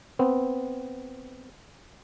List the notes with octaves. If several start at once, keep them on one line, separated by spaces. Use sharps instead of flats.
B3 C4